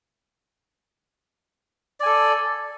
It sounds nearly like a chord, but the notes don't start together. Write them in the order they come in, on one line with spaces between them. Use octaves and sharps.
D5 G#5 A4